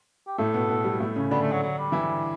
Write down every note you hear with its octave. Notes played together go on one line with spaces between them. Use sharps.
G4
A2 A3 A4
B2 B3
B2 B3
G3
A2 A3
C#3 C#4
D3 B3 D4
A3
F#3
F#3
G3
E3 E4